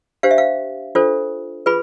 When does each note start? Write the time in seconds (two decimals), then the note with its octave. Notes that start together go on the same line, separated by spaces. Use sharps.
0.23 D4 G4 C5 F5
0.31 E5
0.38 F5
0.95 D4 F4 A4 C5
1.66 F4 G#4 B4 B5